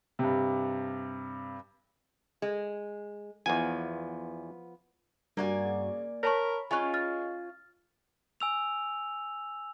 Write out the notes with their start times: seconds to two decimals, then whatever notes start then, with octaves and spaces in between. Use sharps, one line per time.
0.19 G2 C3
2.42 G#3
3.46 E2 F3 B3 G#5
5.37 G2 A#3 F#4 D5 G#5
5.64 C#3
6.23 A#4 C#5 A5 B5 C#6
6.71 G#3 C#4 F4 G#5 C#6 F#6
6.94 F6 A6
8.40 G#5 E6 F7